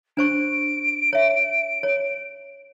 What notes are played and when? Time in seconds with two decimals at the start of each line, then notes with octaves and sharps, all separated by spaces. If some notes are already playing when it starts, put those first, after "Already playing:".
0.17 D4 C5 C#6 D7
1.13 C#5 E5
1.83 C#5